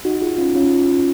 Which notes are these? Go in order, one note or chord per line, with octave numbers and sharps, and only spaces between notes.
D#4 F#4
F4 G#4
C#4 F4
C#4 F4